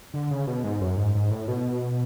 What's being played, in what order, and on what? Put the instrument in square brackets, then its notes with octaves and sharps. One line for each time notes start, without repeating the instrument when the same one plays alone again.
[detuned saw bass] D3
C#3
B2
G#2
F#2
G#2
G#2
A2
B2